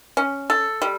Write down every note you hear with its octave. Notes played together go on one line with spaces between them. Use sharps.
C#4
A4
G3